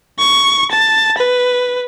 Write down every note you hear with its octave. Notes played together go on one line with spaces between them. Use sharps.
C#6
A5
B4